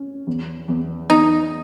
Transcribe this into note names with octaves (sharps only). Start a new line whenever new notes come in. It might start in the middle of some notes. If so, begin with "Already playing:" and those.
Already playing: C#4
E2
E2
E2 D#4